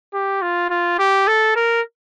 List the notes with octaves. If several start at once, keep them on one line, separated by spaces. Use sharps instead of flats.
G4
F4
F4
G4
A4
A#4